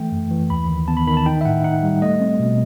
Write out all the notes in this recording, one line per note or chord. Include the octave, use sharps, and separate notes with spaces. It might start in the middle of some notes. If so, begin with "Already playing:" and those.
Already playing: E3 A3 G5
F#2
E3
D#2 B5
D#3
B3 A5
B5
D#3 B5
A5
D#4 G5
E5
A2 F#5
D#4 F#5
G3
A3 D#5
C4
B2